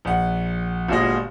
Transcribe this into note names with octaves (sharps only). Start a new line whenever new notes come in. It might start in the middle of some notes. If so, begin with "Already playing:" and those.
A#1 F#5
G1 G2 A#2 G#3 F#4 D#5